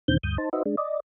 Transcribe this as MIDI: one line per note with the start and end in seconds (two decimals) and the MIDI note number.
0.08 0.17 39
0.08 0.17 46
0.08 0.17 50
0.08 0.17 51
0.08 0.17 60
0.08 0.17 91
0.23 0.37 38
0.23 0.37 43
0.23 0.37 87
0.23 0.37 91
0.38 0.49 63
0.38 0.49 72
0.38 0.49 81
0.53 0.63 63
0.53 0.63 66
0.53 0.63 71
0.53 0.63 72
0.53 0.63 75
0.53 0.63 76
0.66 0.76 56
0.66 0.76 62
0.77 1.00 74
0.77 1.00 75